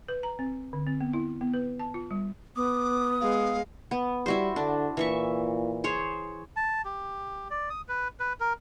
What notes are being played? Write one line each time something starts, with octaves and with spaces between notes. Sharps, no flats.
B4
A#5
C4
D3
C4
B3
E4
B3
B4
A5
F4
G3
B3 D6 D#6
G#3 F5
B3
G3 E4 F#4 C5
D3 D4
A#2 E3 E5 C#6
G#4 C5 C#5
A5
G4
D5
D#6
B4
B4
A#4